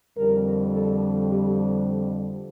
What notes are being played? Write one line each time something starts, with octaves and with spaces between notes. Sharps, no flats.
F2 D3 G3 A#4
A4
G4